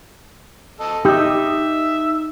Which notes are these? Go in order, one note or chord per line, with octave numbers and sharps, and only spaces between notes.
A4 D#5
D#4 G4 D#5 E5